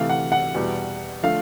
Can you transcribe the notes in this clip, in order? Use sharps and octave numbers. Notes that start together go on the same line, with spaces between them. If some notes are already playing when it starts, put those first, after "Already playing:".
Already playing: C3 E3 A3 F5
F#5
F#5
E2 B2 G3
D3 F3 A3 F5